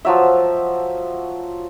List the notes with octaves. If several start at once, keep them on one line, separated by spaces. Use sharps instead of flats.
F3 F#3 E5